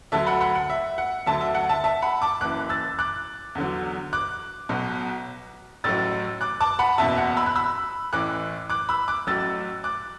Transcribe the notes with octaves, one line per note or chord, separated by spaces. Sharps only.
D2 D3 F#3 E5 A5
F#5 B5
F#5 B5
F#5
E5
F#5
D2 D3 F#3 E5 A5
E5
F#5
E5 A5
E5 A5
F#5 B5
A5 D6
F#1 F#2 E3 D6 F#6
E6 A6
D6 F#6
E2 D3 F#3
D6 F#6
B1 B2 F#3
A1 A2 F#3 E6 A6
D6 F#6
A5 D6
F#5 B5
F#1 E2 B2 E5 A5
F#5
B5 E6
F#6
B5 E6
A1 A2 E3 D6 F#6
D6 F#6
B5 E6
D6 F#6
A1 A2 F#3 E6 A6
D6 F#6